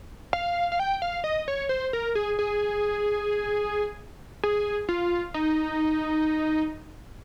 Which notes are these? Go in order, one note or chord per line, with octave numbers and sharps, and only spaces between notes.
F5
F5
G5
F5
D#5
C#5
C5
A#4
G#4
G#4
G#4
F4
D#4